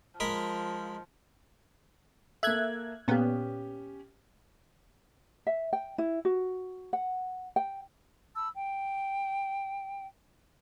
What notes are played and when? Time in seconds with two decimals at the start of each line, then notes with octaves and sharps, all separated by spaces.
0.20 F3 G#3 A#4 B5
2.43 A#3 A4 E5 F#6 G#6
3.08 A#2 B3 C#4 G4
5.47 E5
5.73 G5
5.98 E4
6.25 F#4
6.93 F#5
7.56 G5
8.36 A5 B5 E6
8.55 G5